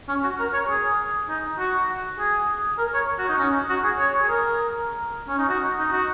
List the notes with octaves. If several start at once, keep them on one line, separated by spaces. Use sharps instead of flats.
C#4
F#4
A#4
C#5
G#4
D#4
F#4
G#4
A#4
C#5
F#4
D#4
C#4
F#4
G#4
C#5
G#4
A#4
C#4
D#4
F#4
D#4
F#4